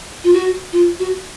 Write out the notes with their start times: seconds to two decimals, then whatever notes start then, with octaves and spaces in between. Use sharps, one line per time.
0.24 F4
0.33 F#4
0.73 F4
0.99 F#4